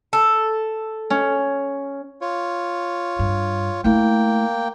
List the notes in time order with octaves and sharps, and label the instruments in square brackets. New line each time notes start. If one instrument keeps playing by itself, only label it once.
[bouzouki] A4
[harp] C#4
[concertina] F4 C#5
[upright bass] G2
[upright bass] A3 E4 [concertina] A#3 G5